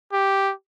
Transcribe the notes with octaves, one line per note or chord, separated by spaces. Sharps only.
G4